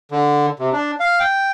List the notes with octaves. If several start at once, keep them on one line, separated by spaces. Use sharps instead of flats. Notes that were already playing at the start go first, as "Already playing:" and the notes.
D3
C3
D4
F5
G5